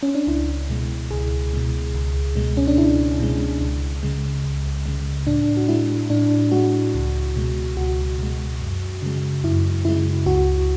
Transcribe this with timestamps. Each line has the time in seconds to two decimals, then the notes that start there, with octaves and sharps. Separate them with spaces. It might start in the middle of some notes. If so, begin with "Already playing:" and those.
0.03 C#4
0.15 D4
0.27 C#2 E4
0.70 B2 G#3
1.11 C#2 G#4
1.53 B2 G#3
1.94 C#2
2.36 B2 G#3
2.57 C#4
2.67 D4
2.77 C#2 E4
3.19 B2 G#3
3.61 C#2
4.03 C#3 G#3
4.44 C#2
4.86 C#3 G#3
5.27 A2 D4
5.57 F#4
5.68 G#3 E4
6.10 A2 D4
6.52 G#3 F#4
6.94 C#2
7.36 B2 G#3
7.77 C#2 F#4
8.18 B2 G#3
8.60 F#2
9.02 C#3 G#3
9.44 F#2 E4
9.85 C#3 G#3 E4
10.26 C#2 F#4